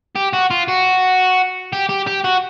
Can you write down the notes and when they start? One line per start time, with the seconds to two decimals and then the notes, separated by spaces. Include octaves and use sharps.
0.16 G4
0.33 F#4
0.50 F4
0.68 F#4
1.73 G4
1.89 G4
2.07 G4
2.24 F#4